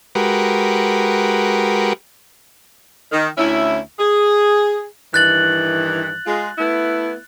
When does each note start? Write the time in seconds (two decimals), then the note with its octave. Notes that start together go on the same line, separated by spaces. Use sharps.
0.15 G#3 F#4 G4 A#4 B4
3.12 D#3
3.38 D2 C#4 E4
3.99 G#4
5.14 G2 D#3 E3 F#6 A6 F#7
6.27 G#3 F4
6.58 A3 B3 E4